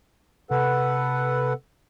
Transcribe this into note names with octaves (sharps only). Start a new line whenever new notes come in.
C3 A4 B4 F#5